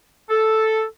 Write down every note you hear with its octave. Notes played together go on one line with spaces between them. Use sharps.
A4